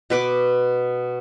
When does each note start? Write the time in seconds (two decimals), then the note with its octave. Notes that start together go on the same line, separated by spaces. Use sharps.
0.10 B2 B4 D6